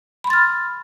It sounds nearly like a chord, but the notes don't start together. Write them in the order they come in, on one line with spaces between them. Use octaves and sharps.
B5 C6 A6 F6